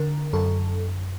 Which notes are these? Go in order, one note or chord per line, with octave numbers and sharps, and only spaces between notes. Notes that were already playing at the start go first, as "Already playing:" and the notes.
Already playing: D3 A#4
F#2 A4